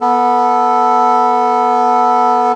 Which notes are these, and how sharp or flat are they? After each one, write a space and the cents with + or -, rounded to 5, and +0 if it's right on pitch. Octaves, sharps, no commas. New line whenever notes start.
B3 -15 A4 +0